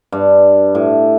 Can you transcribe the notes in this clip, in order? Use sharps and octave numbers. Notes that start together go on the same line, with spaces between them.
G2
A2